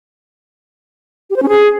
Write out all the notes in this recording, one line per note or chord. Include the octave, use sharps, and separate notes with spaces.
G4
C5
C#4
G#4